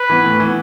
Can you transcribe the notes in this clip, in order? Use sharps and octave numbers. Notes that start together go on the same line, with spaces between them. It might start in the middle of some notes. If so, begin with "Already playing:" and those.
Already playing: B4
E3 B3
A2
E3
B3